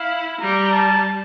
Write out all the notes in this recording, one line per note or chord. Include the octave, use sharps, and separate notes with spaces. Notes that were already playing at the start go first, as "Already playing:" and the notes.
Already playing: E4 F5
G3 A#5
A5